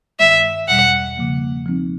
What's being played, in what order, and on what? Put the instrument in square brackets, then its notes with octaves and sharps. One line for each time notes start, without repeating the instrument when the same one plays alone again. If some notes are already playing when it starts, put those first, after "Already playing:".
[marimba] G2 D#3 G#3 [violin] E5
[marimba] E2 B2 G3 [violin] F#5
[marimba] C#3 F3 A#3
F3 G#3 C4 D#4